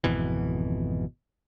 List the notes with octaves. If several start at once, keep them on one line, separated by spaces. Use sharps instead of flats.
G#1 F2 B2 E3